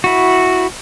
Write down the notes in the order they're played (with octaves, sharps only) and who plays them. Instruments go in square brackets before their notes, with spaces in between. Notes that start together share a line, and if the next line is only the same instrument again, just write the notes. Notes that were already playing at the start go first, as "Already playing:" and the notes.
[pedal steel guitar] E4 F#4